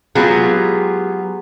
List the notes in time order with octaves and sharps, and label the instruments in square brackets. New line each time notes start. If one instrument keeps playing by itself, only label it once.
[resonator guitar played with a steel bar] F#3 G#3 B3 F4 G4 G#4